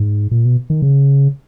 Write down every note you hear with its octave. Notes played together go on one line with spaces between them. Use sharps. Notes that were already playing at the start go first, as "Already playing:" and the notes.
Already playing: G#2
A#2
B2
D#3
C#3